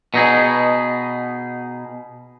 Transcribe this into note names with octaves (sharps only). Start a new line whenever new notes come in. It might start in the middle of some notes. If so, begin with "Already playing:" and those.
B2 D#4 G#4